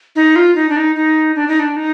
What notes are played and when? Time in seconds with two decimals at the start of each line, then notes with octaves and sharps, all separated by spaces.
0.16 D#4
0.36 F4
0.55 D#4
0.69 D4
0.76 D#4
0.96 D#4
1.36 D4
1.48 D#4
1.59 D4
1.76 D#4